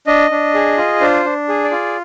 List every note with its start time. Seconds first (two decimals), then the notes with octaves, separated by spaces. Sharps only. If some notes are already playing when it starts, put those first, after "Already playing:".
0.07 D4 D#5
0.31 D4
0.54 G#4
0.77 F4
1.01 D4 C5
1.25 D4
1.49 G#4
1.64 D5
1.71 F4